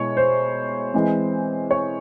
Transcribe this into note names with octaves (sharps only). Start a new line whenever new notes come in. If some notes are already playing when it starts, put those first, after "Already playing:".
Already playing: B2 G#3 E4 C#5
C5
E3 G#3 C4
C#5